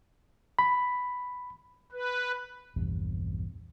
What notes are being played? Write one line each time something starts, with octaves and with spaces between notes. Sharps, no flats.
B5
B4
A#1 E2 G2 C3